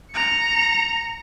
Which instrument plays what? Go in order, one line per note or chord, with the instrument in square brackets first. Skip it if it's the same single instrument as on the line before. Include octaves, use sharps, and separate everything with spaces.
[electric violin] A#5 C#7